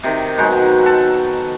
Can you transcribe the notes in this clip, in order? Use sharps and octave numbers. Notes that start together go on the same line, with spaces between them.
C3 D#3
B2 F#3 G#3 D#4
A4 F#5